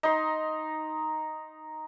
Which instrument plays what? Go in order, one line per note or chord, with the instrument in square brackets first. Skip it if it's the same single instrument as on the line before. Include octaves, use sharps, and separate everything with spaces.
[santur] D#4 C6